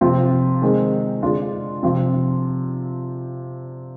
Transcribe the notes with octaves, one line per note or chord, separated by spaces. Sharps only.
C3 F3 C4 F4
D#3 G#3 C4
D3 G#3 D4 F4
C3 F3 C4 F4